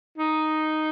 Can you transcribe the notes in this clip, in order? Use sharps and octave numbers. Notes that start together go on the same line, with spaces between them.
D#4